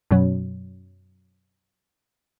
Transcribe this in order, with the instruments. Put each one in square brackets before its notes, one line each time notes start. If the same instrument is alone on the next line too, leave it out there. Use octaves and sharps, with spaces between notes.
[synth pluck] F#2 B2 F#3